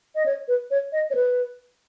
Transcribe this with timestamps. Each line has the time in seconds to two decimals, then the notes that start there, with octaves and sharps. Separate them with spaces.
0.15 D#5
0.26 C#5
0.48 B4
0.71 C#5
0.92 D#5
1.10 C#5
1.15 B4